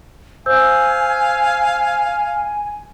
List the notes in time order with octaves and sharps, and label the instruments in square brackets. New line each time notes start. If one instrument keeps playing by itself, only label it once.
[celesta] C5 E6 G6 [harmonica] F5 [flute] G#5